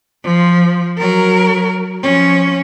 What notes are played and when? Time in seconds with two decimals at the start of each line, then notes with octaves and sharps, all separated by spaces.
0.24 F3
0.98 F#3 A#4
2.02 F3 C#4